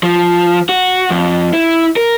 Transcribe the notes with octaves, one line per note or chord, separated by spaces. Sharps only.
F3
F#4
F2
E4
A#4